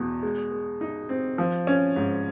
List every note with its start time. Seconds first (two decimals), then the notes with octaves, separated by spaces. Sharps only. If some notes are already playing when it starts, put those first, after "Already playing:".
Already playing: E2 B2
0.23 G#3
0.51 G#3
0.81 D#4
1.09 C4
1.38 F3
1.67 C#4
1.96 G#2